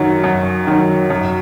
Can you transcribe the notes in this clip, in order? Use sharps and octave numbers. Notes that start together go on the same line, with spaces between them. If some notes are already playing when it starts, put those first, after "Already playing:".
Already playing: F#2 D#3 F#3
F#2
D#3 F#3
F#2